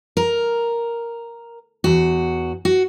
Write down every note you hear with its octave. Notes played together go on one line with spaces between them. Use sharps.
A#4
E2 F#4
F#4